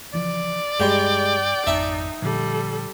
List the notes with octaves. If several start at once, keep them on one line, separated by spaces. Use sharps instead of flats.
C#3 E3 F3 D5
G2 G3 G#3 G4 G5
G#1 F2 D#4 E5 G5 A5
A#2 D3 F3 G3 A4